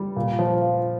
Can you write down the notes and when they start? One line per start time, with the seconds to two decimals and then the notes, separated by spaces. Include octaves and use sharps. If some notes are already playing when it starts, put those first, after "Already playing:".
Already playing: G3
0.16 A#2
0.39 F3
0.62 F4